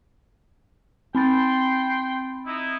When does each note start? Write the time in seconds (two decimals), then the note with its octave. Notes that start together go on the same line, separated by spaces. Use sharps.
1.15 C4 G5 B5 C6 A6
2.46 D#4 E4